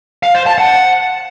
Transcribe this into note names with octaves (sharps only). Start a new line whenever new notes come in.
F5
C5
A5
F#5